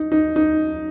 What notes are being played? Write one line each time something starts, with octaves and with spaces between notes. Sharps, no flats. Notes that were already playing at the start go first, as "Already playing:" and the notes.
Already playing: D#4
D#4
D#4